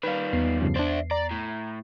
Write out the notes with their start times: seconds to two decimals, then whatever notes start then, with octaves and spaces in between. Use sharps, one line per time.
0.03 D#3 G3 B4 F5
0.33 E2 B3 C7
0.62 G2 C#3 F3
0.76 D4 C5 D5 E5
1.11 D5 A#5
1.31 A2